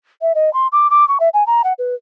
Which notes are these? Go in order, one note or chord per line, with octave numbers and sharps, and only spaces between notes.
E5
D#5
C6
D6
D6
C#6
E5
G#5
A#5
F#5
B4